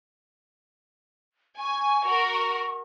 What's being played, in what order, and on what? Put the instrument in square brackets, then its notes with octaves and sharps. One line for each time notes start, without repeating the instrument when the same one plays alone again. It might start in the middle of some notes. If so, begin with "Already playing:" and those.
[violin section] G#5 [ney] C#6
[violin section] F#4 A#4